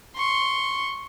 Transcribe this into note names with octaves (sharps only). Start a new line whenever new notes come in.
C6 C#6